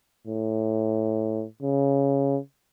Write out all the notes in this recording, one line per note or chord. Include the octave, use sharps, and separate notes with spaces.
A2
C#3